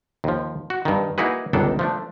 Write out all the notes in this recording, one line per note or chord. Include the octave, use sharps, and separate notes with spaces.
D#2 F3
F#4
G2 D#3
A#3 D#4 E4 F#4 G#4 B4
G1 C#2 D#3 D4 A4
F3 A3 D4